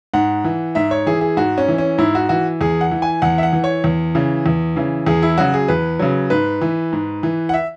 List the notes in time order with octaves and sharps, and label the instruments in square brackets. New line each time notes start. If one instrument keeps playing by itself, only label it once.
[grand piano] G#2 F#5
E3
G#2 E5
C#5
E3 G#4
G#4
G#2 F#4
C#4
E3
C#4
G#2 E4
F#4
E3 F#4
E2 G#4
F#5
E3
G#5
E2 F#5
E5
F#5
E3
C#5
E2
C#3 E3
E2
C#3 E3
E2 G#4
E4
C#3 F#3 F#4
G#4
E2 B4
C#3 F#3
G#2 B4
E3
G#2
E3
F#5
E5